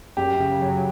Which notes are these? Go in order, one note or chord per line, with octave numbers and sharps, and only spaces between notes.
F#2 G4
C#3
F#3